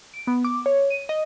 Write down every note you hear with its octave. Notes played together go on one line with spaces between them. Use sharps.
D7
B3
D6
C#5
D#7
D#5